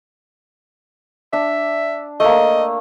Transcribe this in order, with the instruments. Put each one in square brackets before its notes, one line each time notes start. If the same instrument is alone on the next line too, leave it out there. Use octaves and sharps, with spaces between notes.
[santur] D4 [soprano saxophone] E5
[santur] A3 A#3 [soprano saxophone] D#5